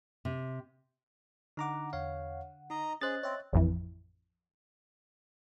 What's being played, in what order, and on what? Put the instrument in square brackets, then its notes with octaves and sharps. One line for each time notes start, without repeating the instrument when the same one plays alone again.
[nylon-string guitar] C3
[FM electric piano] D3 F#5 [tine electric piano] D#4 A#5 D6
[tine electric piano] E2 C#5 F5
[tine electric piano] D#4 [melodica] D#5 A#5
[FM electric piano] C#4 C5 [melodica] G#4 [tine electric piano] D#5 F#6 A6
[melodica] C4 [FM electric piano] C#5 E5 G5
[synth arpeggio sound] A1 F2 E3